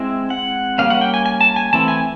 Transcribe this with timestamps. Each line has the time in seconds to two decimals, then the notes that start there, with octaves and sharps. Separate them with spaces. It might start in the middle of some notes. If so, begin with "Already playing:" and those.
Already playing: G#3 C4 E4
0.30 F#5
0.78 G3 A#3 C#4 F5
0.90 F#5
1.01 G5
1.14 G#5
1.26 G#5
1.41 A5
1.56 G#5
1.73 E3 A3 C4 E4 A5
1.88 G#5